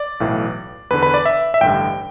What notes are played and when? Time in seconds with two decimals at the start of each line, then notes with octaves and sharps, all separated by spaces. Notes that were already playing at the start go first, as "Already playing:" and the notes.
Already playing: D5
0.20 B1 A2 E3
0.91 E2 D3 B4
1.03 B4
1.14 D5
1.26 E5
1.54 E5
1.61 A1 G2 D3 G5